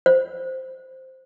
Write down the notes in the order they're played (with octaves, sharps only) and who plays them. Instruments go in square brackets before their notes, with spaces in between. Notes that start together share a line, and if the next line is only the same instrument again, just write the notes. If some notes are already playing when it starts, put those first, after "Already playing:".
[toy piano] C5